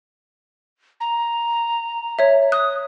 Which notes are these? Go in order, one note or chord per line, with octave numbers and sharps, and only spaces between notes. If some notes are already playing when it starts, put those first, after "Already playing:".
A#5
C#5 E5
D#6 F#6